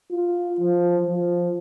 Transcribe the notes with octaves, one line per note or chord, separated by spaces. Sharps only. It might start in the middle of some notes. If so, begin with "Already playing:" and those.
F4
F3
F3